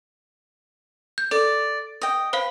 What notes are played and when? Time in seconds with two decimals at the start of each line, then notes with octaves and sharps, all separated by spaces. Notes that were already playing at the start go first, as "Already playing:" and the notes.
1.18 G6
1.31 A4 D5
2.02 D#5 G5
2.33 B4 C5 F5